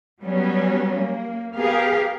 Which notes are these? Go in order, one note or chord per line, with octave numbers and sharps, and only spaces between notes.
F#3 G3 B3 C#4
A#3
B3 G4 G#4 A#4 F5